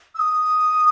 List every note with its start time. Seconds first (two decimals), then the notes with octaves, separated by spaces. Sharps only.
0.15 E6
0.19 D#6